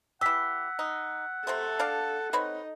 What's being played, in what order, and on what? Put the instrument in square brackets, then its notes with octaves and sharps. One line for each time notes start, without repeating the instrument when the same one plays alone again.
[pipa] E3 G4 [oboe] F#5 [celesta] E6 B6
[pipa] D#4
[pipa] C3 A3 C5 [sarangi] A4
[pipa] D4 D5 F5
[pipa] C4 B4 C#5 [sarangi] D#4